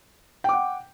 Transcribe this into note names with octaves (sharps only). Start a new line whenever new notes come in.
F#5 G5 D6